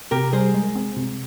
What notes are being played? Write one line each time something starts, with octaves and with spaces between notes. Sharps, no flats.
C3 G4 A#4
G3 G#4 C5
G#3
C4
C3